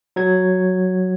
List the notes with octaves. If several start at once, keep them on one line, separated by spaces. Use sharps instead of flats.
F#3 G#6